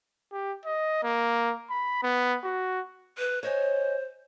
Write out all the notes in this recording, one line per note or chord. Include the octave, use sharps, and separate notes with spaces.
G4
D#5
A#3
B5
B3
F#4
B4
C5 C#5 D#5 G#5